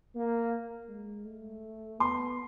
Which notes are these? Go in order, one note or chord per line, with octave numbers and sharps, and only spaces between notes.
A#3
G#3
A3
B3 C6